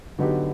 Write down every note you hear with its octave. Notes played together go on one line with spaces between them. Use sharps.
D3 F#3 B3 D#4 G4